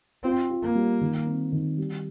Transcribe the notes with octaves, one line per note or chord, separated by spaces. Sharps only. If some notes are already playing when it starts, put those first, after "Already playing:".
C4 F4
F4
A#3
G3
D#3
C4
D#3
G3